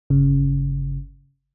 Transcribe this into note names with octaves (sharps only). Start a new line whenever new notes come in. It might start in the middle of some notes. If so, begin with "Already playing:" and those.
G1 C#3